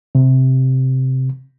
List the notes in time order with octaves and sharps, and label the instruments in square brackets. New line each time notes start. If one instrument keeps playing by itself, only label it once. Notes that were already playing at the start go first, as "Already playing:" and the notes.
[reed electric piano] C3